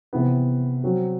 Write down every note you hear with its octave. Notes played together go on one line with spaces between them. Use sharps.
C3 E3 B3
F#3 C4 F#4